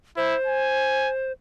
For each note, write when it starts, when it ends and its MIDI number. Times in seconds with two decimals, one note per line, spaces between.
0.17 0.35 64
0.17 1.32 72
0.47 1.10 80